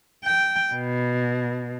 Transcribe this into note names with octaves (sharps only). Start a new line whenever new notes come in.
G5
B2